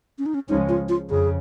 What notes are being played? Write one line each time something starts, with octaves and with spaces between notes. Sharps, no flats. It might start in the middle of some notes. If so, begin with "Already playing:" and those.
C#4
D#4
C#4
C#2 C#3 F3 G#3 C#4 D#4
F4
F4
F2 C#3 G#4